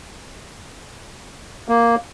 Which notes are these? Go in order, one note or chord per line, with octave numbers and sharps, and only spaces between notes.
A#3